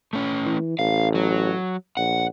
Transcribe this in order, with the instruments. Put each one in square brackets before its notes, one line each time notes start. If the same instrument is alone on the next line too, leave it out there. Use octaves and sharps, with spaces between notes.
[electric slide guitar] A3 C#4
[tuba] E3
[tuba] A1 [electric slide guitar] F5
[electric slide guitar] F#3
[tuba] A#1 [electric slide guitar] F#5